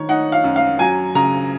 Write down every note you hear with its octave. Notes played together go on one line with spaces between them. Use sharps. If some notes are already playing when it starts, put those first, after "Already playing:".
Already playing: D#3 C#5
D#4 F#5
F5
F#2
F5
F#3 G#5
C#3 A#5